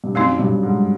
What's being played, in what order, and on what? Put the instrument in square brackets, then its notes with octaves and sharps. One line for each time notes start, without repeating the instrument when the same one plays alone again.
[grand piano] G2
[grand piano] F#2 [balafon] F#3 A3 C4 D#4
[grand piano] G2
G#2